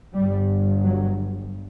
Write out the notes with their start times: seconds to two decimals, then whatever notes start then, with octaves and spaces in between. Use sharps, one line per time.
0.13 G1 G2 G3
0.83 F#3